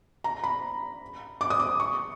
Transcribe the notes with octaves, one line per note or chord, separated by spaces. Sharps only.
A#5
B5
D6
D#6
D6
C#6